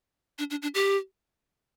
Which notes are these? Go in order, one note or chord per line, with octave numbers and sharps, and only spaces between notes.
D4
D4
D4
G4